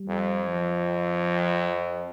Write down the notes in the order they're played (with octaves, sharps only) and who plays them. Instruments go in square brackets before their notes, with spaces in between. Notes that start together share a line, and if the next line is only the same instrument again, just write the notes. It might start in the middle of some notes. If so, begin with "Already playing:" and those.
Already playing: [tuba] G3
[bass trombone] F2
[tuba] F3